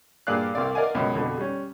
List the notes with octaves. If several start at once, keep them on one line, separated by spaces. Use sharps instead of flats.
G2 A#2 G#4 D5 F5 F#6
C2 C4 D5 F5
A#4 D5 D#5 F5 F#5 G#5
C#2 F#2 B2
F2 B2 D3
G3 C#4